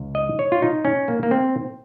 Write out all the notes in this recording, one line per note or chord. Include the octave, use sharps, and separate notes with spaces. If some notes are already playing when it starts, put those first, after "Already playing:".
Already playing: C#2
D#5
C#5
F4
D#4
C#4
A#3
A#3
C4